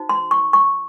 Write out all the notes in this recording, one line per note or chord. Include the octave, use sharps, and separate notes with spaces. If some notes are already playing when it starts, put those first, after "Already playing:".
Already playing: D#4 F#4 C5
C6
C#6
C#6